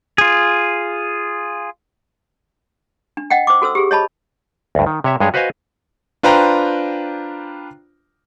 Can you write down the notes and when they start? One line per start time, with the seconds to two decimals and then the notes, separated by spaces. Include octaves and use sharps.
0.18 F4 G#4
3.17 D4
3.30 D#5 F#5 G5
3.47 C5 D6
3.62 F#4 A4 C5 E6
3.75 G4 G#4
3.91 C#5 D#5 A5 B5
4.75 D2 G2
4.86 D#3
5.04 C3 C#5 E5
5.20 G2 G#3 G#4 C#5
5.34 F#4 B4 C5 D#5 F5 G#5
6.23 D4 F4 B4 C5 G5 A#5